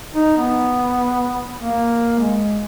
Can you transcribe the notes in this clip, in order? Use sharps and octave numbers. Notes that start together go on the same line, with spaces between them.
D#4
B3
A#3
G#3